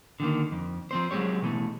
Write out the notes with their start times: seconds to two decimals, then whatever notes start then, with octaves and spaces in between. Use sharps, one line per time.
0.20 D3 D#3 A#3
0.52 F2
0.91 F3 C4 C5
1.11 F#3 G#3 C4 G4 C#5
1.42 B2 E3 A3